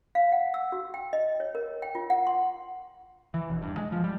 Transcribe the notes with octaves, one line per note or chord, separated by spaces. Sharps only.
F5
F#5
E6
F#4
G5
D#5
C#5
A#4
G5
F4
F#5
C6
E3
E1
G2
G#3
F3
G3